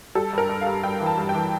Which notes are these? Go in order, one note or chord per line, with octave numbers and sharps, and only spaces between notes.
G3 A4
G2 A#4
G2
F5
G2
G2 G5
E3
A5
G2
G5
E3